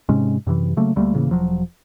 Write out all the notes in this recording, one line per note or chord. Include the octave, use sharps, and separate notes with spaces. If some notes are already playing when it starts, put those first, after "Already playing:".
G#2 C3 G#3 C#4
F#2 C3 D#3 E3
C#3 F#3 A3 A#3
D2 G3 A3 A#3
A2 C#3 E3 A#3
E1 F3 F#3